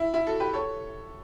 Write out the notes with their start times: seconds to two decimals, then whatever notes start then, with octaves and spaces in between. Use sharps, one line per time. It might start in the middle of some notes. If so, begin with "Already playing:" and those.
Already playing: E4
0.14 E4
0.26 F#4 A4
0.40 G4 B4
0.53 A4 C#5